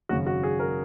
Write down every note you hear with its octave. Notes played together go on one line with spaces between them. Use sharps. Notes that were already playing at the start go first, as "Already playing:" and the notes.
G#1 F#2 C#3 F#4
F#4
G#4
A#4